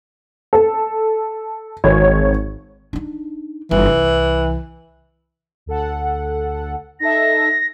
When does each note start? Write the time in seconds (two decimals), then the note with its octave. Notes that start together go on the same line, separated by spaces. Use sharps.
0.53 A4
1.84 G#1 C#5
2.93 D4 D#4
3.71 G1 E3
3.86 C2
5.66 D2 A4 F#5
7.00 D#4 A4 E5 A#6